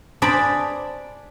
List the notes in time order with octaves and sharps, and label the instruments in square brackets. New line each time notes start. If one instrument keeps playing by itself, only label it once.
[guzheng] D4 G#4 C5 D5 A#5 B5